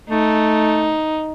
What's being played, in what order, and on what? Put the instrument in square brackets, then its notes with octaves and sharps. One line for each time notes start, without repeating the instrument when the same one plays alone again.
[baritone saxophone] A3 [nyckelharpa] D#4